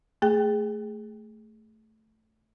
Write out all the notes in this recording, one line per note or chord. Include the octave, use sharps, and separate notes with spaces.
A3 G#4 G5